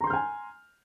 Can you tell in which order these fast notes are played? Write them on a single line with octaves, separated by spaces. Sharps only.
A#5 C6 G6 F6 G#5